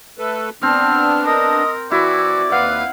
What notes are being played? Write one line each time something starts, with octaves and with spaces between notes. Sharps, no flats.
A3 A4 B4
B3 C4 D4 F6
A#4 D#5
E3 E4 F#4 D5
D#2 B4 F5 F#5